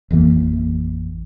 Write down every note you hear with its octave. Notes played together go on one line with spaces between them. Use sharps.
A1 F2 E3 A#3